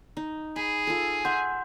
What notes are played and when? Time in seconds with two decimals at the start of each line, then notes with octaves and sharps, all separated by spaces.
0.17 D#4
0.56 G#4 B5
0.87 F4 A4
1.25 E5 F#5 G#5 C6 G6